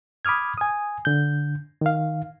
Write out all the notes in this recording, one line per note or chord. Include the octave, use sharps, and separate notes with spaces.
B5 D6 D#6 F6 G#6
G#5 D#6
D3 G6
D#3 F5